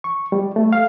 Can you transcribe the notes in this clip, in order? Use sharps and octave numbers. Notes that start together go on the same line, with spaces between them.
C#6
G3
A3
F5